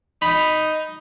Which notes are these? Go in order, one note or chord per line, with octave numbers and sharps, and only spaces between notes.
D#4 B5